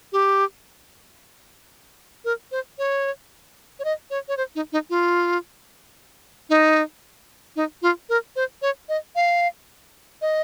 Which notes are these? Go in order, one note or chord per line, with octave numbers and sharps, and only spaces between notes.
G4
A#4
C5
C#5
C#5
D#5
C#5
C#5
C5
D#4
D#4
F4
D#4
D#4
F4
A#4
C5
C#5
D#5
F5
D#5